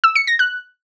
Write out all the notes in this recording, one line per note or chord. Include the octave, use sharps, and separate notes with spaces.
E6
C#7
A#6
F#6